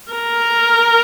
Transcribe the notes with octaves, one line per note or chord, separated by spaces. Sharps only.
A#4